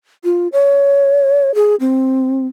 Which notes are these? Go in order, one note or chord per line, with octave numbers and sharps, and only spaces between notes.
F4
C#5
G#4
C4